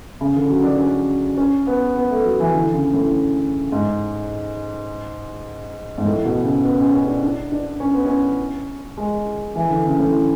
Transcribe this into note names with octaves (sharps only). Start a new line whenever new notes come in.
C#3
D3
F#3
D4
C#4
C#4
B3
B3
A3
F#3
E3
D3
C#3
A2
G#2
G#2
A2
B2
C#3
B3
C#4
C#4
D4
D4
D4
C#4
B3
C#4
G#3
E3
D3
C#3
A2